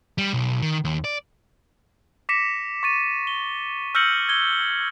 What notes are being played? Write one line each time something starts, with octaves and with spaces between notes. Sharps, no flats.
G3
B1
D#3
D#2
D5
D6 A#6 B6 C#7 E7
C#6 A6 D#7
G7
E6 F6 G6 A#6 C#7 F#7
G#6 G7